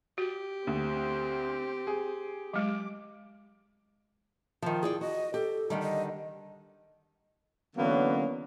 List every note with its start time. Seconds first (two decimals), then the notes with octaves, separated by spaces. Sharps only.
0.18 F#4 G4
0.67 D2 C4
1.87 G#4
2.54 F#3 G#3 D6
4.62 D#3 F3
4.83 E4 G#4 D5 G5
5.01 F#4 D#5
5.34 G4 A4
5.70 D3 D#3 G3
5.82 D#5
7.76 D3 E3 F#3 A#3 B3 C#4